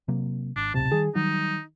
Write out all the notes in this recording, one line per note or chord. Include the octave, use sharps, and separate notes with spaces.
C3 F#3 A#3
G#1 D4
D1 B1 C3 A5
D#3 G3 G#4
D#3 F#3 G3 D#4